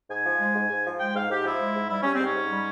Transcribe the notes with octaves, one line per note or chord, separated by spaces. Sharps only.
G#2 G#5
F3
G#3
G#2
G#2
F3
G#3 G5
G#2 F5
G#2 G4
F3 E4
G#3
G#2
G3 E4
G3 C#4
C4
G#2
C#4
G#2
G3